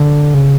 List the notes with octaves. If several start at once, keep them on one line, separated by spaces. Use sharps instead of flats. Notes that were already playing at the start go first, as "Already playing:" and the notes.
Already playing: D3
C#3